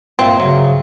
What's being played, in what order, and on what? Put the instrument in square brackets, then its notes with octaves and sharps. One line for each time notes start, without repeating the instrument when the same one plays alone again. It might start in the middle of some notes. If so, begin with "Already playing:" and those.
[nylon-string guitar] G2 E5 F5 [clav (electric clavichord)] A#2 [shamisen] C4
[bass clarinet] C#3 [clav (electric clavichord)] F#3